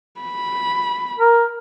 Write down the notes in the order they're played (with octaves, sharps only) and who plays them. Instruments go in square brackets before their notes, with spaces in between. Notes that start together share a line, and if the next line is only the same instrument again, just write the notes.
[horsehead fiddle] B5
[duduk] A#4